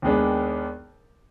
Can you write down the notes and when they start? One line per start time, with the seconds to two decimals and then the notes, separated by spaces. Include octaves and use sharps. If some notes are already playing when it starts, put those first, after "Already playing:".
0.02 D#2 D#3 G#3 B3 D4